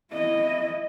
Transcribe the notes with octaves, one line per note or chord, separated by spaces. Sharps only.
E4 D#5